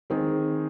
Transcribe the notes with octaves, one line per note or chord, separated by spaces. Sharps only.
D#3 G#3 C4 G#4